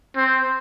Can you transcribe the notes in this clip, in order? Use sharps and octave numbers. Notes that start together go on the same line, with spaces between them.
C4